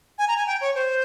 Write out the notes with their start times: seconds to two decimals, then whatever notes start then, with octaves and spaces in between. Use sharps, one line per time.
0.18 G#5
0.28 A#5
0.37 G#5
0.47 G5
0.61 C#5
0.75 C5